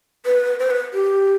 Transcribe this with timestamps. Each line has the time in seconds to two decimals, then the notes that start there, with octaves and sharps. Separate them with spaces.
0.26 B4
0.59 C5
0.70 B4
0.93 G4